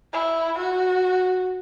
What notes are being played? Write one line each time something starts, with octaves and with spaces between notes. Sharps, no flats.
E4
F#4